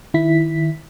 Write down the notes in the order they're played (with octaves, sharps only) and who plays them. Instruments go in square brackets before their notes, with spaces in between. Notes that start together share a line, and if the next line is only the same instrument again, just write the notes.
[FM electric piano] D#3 E4 B6